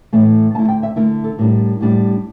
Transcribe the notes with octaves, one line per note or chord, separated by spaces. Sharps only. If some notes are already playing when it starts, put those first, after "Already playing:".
A2 E3 A3 E4
D3 A3 E4 A5
G5
E5
D3 A3 E4 A#4
A4
A2 G3 D4 A#4
A2 G3 D4